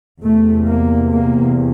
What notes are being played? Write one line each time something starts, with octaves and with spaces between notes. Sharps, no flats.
E2 C3 A3
A#3
A#3